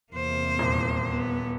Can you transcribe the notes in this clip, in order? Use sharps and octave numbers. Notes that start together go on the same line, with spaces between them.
E2 C3 A#3 C5
D#1
B3